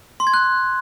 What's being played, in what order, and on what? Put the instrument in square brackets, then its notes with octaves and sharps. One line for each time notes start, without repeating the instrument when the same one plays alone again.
[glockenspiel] C6
G#6
F#6